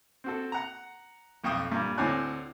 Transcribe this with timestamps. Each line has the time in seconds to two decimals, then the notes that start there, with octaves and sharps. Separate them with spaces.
0.24 C4 F#4 A4
0.52 F#5 A#5
1.44 B1 F2 G5 C#6 D#6
1.72 G2 A#2
1.98 D2 A2 C4 C#5 G#5 F#6